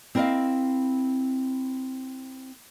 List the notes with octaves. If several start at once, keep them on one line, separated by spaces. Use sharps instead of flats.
C4 E4 A#4 C5 D#5 F5